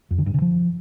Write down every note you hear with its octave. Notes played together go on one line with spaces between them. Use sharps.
F2
D3
G2
C#3
F3